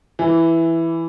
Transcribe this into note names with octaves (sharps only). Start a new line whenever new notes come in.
E3